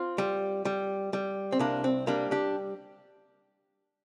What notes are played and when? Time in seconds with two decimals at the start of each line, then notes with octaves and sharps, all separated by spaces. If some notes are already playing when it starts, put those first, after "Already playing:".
Already playing: C4 F4
0.18 G3
0.65 G3
1.13 G3
1.52 C4
1.59 C2 A#3 D4
1.84 C4
2.07 G3 A#3 D4
2.31 D4 G4